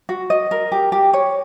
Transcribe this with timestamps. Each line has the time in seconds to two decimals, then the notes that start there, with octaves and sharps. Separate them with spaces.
0.09 F#4
0.30 D#5
0.51 A#4
0.72 G4
0.92 G4
1.13 C#5